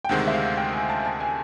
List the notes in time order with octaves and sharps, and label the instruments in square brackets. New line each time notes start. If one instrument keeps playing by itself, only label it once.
[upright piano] G5
[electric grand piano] D2 C3 D#3 G#3 C4 [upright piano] F#5
[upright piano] E5
F5
G5
G#5
A5
A5
G#5